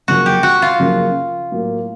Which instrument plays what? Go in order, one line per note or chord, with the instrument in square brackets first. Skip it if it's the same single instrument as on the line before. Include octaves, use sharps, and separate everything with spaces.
[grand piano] F#2 C#3 F3 A#3 C#4 [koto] F#4
[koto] G4
F#4
F4
[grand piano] F#2 C#3 F3 A#3 C#4
A2 F#3 A#3